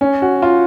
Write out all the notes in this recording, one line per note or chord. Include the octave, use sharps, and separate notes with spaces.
C#4
F#4
F4